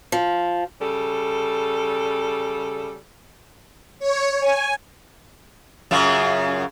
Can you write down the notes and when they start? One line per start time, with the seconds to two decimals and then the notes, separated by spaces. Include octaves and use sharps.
0.12 F3
0.80 C#3 G3 A4
3.99 C#5
4.40 G#5
5.91 F#2 C#3 F4